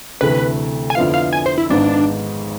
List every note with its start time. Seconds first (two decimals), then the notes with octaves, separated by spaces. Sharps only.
0.21 D2 C3 E3 A3 B4
0.90 G#5
0.95 F2 D3 F3 B3 E4 F5
1.14 F5
1.33 G#5
1.46 C5
1.58 E4
1.70 G#1 G#2 G#3 B3 D4